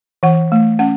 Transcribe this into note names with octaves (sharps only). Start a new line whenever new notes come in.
E3 F#5
A3
C#4 F#5